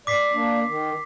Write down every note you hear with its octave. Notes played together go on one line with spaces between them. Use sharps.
D5 D6 B6 C7
A#3 D4
D#3